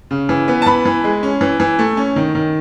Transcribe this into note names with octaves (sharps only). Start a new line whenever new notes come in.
C#3
E3
B3
A5
E3 B5
E3
G#3
C#4
E3
E3
A3
C#4
D#3
D#3